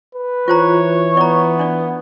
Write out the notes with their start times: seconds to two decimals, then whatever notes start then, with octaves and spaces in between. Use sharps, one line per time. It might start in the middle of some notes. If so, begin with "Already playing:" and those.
0.15 B4
0.48 E3 F4 C5 C#5 A#5
1.17 B3 D5 A#5
1.59 D4 D5